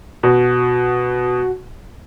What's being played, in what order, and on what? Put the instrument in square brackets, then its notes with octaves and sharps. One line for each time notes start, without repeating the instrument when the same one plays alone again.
[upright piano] B2 [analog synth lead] F#4